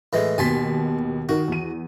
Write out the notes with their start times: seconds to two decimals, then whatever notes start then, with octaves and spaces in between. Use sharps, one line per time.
0.13 A2 E3 G#3
0.38 D#2 B2 G#5 A5 C6 B6
1.29 D#3 F#4
1.48 E2 D#7